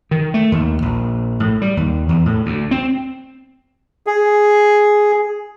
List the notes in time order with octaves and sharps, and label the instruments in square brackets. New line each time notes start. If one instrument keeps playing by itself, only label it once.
[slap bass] D#3
A3
D#2
A#1
A2
G3
D#2
E2
A2
D2
C4
[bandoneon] G#4